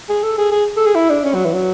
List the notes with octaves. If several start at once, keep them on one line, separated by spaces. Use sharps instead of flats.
G#4
A4
G#4
G#4
A4
G#4
E4
D4
C#4
F#3
E3
F#3